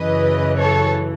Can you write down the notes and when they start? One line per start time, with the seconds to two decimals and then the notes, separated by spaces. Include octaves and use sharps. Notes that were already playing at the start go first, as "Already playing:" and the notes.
Already playing: F#2 C#3 E3 B4 D#5
0.58 A4 C#5